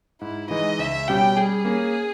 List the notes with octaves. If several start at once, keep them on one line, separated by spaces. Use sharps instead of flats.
G#2 E4
E3 G#3 D#4 D#5
C#2 E5
B2 G3 C#4 G4 G5
G3 G#4
A#3 C#4